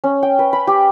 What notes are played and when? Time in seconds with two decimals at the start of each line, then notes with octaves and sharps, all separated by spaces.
0.04 C#4
0.23 G5
0.39 B4
0.53 B5
0.67 G4